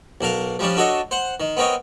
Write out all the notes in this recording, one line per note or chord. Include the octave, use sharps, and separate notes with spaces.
B1 D4 A#4 F5
F3 G3 C#4 D4
D4 F#4 A4 C#5 D#5
C5 F#5
D#3
B3 C4 A#4 C#5 D#5